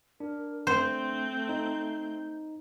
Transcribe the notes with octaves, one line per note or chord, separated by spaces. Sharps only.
D4 A#4
A3 C4 C5 G6
D#4